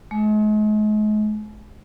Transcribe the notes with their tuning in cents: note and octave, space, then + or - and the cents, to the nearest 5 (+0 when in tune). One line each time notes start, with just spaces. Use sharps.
G#3 +40